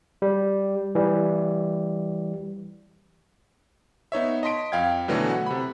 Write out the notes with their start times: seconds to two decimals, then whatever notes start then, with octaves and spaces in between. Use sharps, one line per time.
0.22 G3
0.95 E3 G3
4.12 B3 D#4 C#5 E5
4.43 D#5 A5 C6 B6 D7
4.72 F2 F5 G5 G#6
5.08 B2 D3 E3 F#3 A3
5.30 F#5
5.46 C3 B5